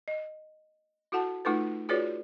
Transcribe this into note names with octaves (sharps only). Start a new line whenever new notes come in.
D#5
E4 F#4 A4 F#5 A5
A3 D#4 F4 A4 B4
F4 F#4 G#4 B4 C#5 D5